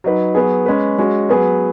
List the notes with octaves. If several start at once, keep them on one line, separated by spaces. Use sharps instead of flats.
F#3 D#4 B4
F#3 B3 G#4
G#3 C#4 B4
G#3 C#4 F#4
F#3 B3 G#4 B4